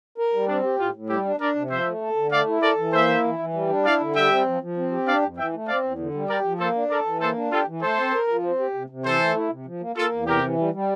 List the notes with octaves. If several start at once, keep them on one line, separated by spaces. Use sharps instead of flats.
A#4
G3
C4 D4
G4
A2 F4
A2
G3 E4 G4
D4
D4 A#4 D5
C3
F3 C5 E5
A3
A4
D3
A3 D5 F5
E4
A4 A#4 D5
E3
A#3 C5 E5
E4
E3
E3
G3
D4
E4 D5 F5
D3
G3 E5 G5
C4
F3
F3
C4
G4
D4 D5 F5
F2
E3 E5 G5
A3
C4 D5 F5
E2
D3
G3
G4 A#4 D5
F3
A#3 A4 C5
D4
A4 A#4 D5
E3
A#3 A4 C5
D4
F4 G4 A4
E3
A3 A4 C5
C4
A#4
F3
C4
G4
C3
C3
E3 A4 C5
A3
E4
C3
F3
A#3
A#3 F4 A4
E2
C3 G4 A#4
E3
G3
G3